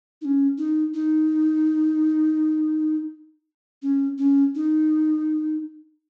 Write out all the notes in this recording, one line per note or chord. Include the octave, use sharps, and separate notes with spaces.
D#4
C#4
D#4
D#4
C#4
C#4
D#4